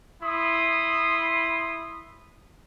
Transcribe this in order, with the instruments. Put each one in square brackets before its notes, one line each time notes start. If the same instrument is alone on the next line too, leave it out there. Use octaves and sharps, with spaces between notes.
[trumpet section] E4 B5 C6 D#6